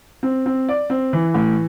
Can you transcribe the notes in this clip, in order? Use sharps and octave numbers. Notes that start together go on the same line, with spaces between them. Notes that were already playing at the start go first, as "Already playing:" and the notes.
C4
C4
D5
C4
E3
A2